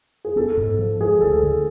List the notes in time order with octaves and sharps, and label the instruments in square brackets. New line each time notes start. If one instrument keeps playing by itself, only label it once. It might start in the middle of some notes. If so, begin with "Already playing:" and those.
[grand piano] G#4
[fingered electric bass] B3 [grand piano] A4
[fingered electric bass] G#2
F3
[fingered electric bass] G#3 [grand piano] G#4
[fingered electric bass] D2 [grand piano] A4
[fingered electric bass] D3